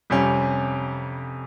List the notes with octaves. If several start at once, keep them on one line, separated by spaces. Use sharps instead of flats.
F2 C3 G3 C#4